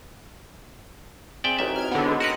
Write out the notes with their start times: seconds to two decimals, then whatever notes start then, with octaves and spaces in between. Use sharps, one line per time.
1.44 C4 G#4 D5 E5 G5
1.59 A1 F#3 D#4 E5
1.76 F6 G#6
1.91 D3 B3
2.06 G#3
2.20 F#4 A#4 B4 F#5 F#6